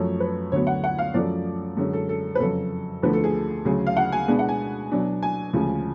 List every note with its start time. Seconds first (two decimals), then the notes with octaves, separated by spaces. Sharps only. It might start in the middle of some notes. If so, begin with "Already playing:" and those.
Already playing: F#2 F3 A3 C#5
0.20 B4
0.52 D2 D3 F#3 B3 C#5
0.67 F#5
0.84 F#5
0.99 F5
1.14 F#2 F3 A3 C#4 D5
1.77 F#2 D3 G#3 C#4
1.93 A4
2.09 A4
2.35 B4
2.40 F2 C#3 F#3 A4
3.03 D2 D3 F3 A3 B4
3.13 A4
3.24 G#4
3.65 D2 C#3 F#3 G#4
3.87 F5
3.97 F#5
4.12 G#5
4.28 B2 G#3 B3 D4
4.39 F#5
4.49 G#5
4.92 B2 F#3 B3 D4
5.23 G#5
5.53 D2 C#3 F3 G#3